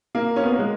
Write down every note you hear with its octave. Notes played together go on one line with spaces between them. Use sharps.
A#3
C#4
B3
A#3
G#3